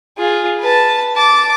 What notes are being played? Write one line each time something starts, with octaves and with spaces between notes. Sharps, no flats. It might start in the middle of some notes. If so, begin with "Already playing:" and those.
F4 G#4
B4 A5
A5 D6